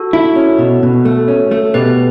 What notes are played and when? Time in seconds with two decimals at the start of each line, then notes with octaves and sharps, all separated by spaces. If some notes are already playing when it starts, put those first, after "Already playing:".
Already playing: F#4 A4
0.13 E4
0.36 C#4
0.59 B2
0.83 B2
1.05 A3
1.28 C#4
1.51 A3
1.74 B2 G4 B4